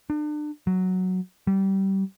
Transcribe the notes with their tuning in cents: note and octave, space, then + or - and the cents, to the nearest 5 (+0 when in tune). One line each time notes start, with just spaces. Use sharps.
D4 +35
F#3 +0
G3 -25